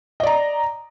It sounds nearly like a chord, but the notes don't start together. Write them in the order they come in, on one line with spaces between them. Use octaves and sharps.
D#5 D5 A#5